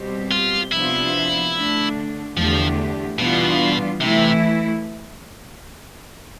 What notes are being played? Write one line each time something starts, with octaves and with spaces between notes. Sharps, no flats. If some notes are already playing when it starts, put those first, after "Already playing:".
Already playing: B2 G3 C4 G4
F4
C3 F3 B3 D4 E4 F4
D3 A3 D4
E2 D3 F3 A3 D4 G4
B2 E3 G3 B3 D4 F4
C3 E3 A3 E4